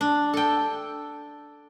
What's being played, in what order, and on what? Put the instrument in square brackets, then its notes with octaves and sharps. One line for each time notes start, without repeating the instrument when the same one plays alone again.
[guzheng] D4
A4 G5